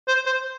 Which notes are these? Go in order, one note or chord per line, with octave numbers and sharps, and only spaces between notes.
C5
C5